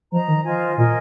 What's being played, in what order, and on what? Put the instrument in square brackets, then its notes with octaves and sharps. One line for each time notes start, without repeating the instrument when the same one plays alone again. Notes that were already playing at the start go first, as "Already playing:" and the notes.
[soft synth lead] F3 [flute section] C5 D#5 A#5
[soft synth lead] D#3
[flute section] F4 C5 D#5 G#5
[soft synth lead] A#2 [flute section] A#4 D#5 G#5